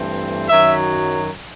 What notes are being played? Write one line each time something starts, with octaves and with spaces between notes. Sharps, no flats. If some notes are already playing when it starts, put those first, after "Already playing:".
Already playing: G2 E3 A3 C4
F#2 D#3 F#3 E5